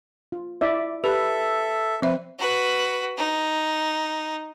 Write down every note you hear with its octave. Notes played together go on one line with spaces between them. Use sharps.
F4
E4 D5 E5
G4 A4 B4 E5
F3 C4 B4 E5
F#4 B4
D#4